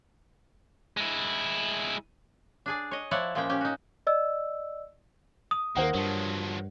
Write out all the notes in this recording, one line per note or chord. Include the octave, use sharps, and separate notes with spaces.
G#3 E4
D4 G#4 D5
C#5 D#5
F3 E4 C#5 D5 F#5
A#2 F3 G#3 A#3 C#4 G5
C#4 G4
D#4 F#4
D5 D#5 E6
D#6
D#2 D#3 A#3 A#4 C5 F#5
G2 F3 F#3